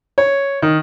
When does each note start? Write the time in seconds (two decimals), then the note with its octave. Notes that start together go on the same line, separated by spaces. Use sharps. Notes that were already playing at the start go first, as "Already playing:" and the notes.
0.18 C#5
0.62 D#3